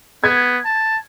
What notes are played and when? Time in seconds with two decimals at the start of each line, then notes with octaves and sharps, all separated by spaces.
0.24 B3 G#6
0.65 A5